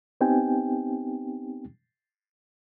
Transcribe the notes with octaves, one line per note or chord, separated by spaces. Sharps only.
B3 C4 D#4 G4 G5 G#5